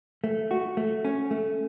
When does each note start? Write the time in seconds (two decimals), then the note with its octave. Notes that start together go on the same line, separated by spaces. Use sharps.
0.24 A3
0.51 F#4
0.77 A3
1.05 C#4
1.31 A3